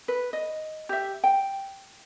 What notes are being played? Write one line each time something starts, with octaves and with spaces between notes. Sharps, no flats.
B4
D#5
G4 E5
G5